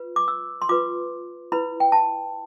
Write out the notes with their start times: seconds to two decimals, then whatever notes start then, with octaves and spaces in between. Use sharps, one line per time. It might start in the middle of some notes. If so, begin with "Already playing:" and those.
Already playing: F4 B4
0.16 D6
0.28 E6
0.62 C6
0.69 F4 B4 D6
1.52 E4 B4 B5
1.80 G5
1.92 A5